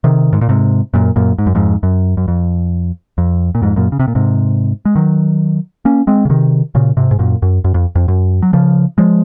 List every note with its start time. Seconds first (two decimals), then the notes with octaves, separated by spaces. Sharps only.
0.04 C3 D#3
0.33 G#2
0.41 A#2
0.49 G#2 C3
0.94 F#2 A#2
1.16 F#2 A#2
1.38 G#2
1.47 F#2
1.55 F2 G#2
1.83 F#2
2.17 F#2
2.28 F2
3.18 F2
3.55 A#2
3.62 F2 G#2
3.76 F#2 A#2
3.92 C#3
4.00 C3
4.08 A#2
4.15 G#2 C3
4.85 G#3
4.95 D#3 F#3
5.85 A#3 C#4
6.07 G#3 C4
6.25 C#3
6.30 C3 D#3
6.75 A#2 C#3
6.97 G#2 C3
7.11 G#2
7.19 F#2 A#2
7.42 F#2
7.64 F#2
7.74 F2
7.95 F2
8.08 F#2
8.42 F#3
8.53 C#3 F3
8.98 F3 G#3